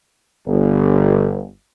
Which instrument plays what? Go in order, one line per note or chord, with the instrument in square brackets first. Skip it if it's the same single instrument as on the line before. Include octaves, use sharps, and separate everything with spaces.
[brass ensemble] G1